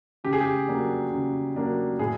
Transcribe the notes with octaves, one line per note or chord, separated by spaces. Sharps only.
C#3 G4
G#4
G4
F#3 A#3 D4
C#3
F#3 A#3 D4
A2 G#4